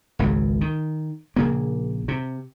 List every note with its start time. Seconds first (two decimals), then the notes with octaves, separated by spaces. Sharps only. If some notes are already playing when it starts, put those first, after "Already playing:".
0.19 G#1 C#2 C#3
0.61 D#3
1.36 A#1 C#3 A#3
2.08 C3